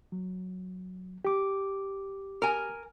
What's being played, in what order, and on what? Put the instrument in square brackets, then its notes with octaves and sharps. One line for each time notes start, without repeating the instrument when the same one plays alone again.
[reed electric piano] F#3
G4 D6
[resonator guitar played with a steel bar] A#4 G#5